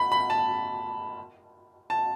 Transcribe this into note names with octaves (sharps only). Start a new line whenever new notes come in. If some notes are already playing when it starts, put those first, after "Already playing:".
Already playing: B5
B5
A5
A5